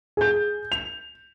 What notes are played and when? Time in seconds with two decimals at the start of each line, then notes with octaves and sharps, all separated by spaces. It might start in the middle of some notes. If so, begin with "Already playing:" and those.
0.17 G#4 G6
0.72 F7